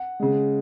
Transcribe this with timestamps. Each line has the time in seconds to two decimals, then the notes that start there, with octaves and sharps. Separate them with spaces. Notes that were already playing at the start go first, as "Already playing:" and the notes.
Already playing: F#5
0.20 C#3 G#3